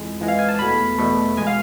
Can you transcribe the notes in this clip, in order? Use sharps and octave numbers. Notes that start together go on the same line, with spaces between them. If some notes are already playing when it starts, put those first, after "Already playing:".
Already playing: F2 E3 G#3
F2 E3 G#3
F5
G#5
A5
E2 B2 A3 B5
E2 B2 A3
B2 G#3 G#5
F5